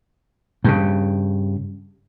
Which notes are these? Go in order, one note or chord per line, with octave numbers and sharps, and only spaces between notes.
G2 C#3